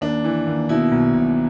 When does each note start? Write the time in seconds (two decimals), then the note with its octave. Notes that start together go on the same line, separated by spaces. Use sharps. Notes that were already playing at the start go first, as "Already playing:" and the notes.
0.01 D#2 D4
0.24 E3
0.47 D#2
0.69 B2 E4
0.92 B1
1.14 B1